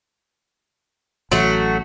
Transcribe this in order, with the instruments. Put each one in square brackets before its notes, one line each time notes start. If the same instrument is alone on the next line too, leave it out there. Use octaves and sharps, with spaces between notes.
[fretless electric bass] A1 [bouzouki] F#3 A3 F#4